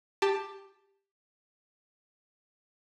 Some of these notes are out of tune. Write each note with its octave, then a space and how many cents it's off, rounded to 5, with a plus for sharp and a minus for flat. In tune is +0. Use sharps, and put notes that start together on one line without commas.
G4 +10 A5 +0